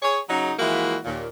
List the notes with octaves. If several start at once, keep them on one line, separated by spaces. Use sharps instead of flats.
G#4 C#5
C#3 F#3 D#4
E3 F3 G#3 A#3 E4 F#4
D#2 A#2